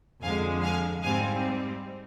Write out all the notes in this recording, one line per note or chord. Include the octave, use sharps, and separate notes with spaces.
F2 D3 G#3 F5 G#5
F5 G#5
G#2 G3 C4 F5 G#5